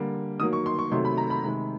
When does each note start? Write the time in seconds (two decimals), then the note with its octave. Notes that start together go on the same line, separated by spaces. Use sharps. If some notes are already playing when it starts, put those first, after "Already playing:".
Already playing: D3 G3 A#3
0.40 D#3 F#3 A#3 D#6
0.53 C#6
0.66 C6
0.79 C#6
0.91 C3 D#3 F#3 A3 C6
1.05 B5
1.17 A#5
1.30 B5
1.43 C3 D#3 G#3